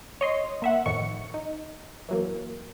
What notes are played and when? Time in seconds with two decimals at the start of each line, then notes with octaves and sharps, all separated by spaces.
0.21 C#5 D#5 C6
0.62 A#3 E5 F#5
0.86 F2 A2 D#3 C#6 C#7
1.34 D#4
2.09 E3 F#3 A#3